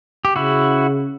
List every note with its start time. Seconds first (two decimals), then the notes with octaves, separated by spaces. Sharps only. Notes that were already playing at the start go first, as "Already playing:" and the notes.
0.25 G4
0.35 C#3 E4 F#4